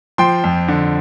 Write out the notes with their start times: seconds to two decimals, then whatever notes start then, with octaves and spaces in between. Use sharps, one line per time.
0.18 F3 G5 C6
0.44 F2
0.68 D3